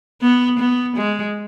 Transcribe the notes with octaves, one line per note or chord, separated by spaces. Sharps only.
B3
B3
G#3